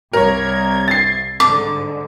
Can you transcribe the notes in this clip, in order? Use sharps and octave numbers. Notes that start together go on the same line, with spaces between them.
C2 A#4 C#5 G#6
A6 C7
G#2 D3 D6